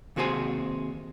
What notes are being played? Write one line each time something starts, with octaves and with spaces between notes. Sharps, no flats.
D#2 C3 F#4 G#4 C5 G#5